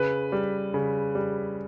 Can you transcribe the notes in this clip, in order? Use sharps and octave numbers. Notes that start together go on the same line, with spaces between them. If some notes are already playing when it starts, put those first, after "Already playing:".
Already playing: C#3 B4
G3
C#3
G3